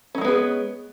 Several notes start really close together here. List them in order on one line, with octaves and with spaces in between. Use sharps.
C#4 F#3 G#3 B3 G#4